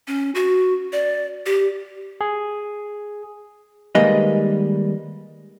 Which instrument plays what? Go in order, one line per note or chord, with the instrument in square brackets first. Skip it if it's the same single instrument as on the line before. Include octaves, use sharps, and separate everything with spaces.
[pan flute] C#4
F#4
D5
G4
[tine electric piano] G#4
[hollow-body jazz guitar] D#3 G3 G#3 A#3 B4 D#5